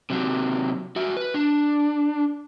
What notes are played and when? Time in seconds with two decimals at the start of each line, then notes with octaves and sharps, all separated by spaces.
0.10 C3 F#3
0.96 F#4 E5
1.17 B4
1.34 D4